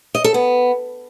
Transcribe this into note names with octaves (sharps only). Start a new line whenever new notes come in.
D#5
A4
B3